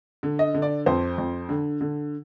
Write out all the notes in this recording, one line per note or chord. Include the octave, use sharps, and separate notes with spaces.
D3
D#5
D3
D5
F2 C5
F2
D3
D3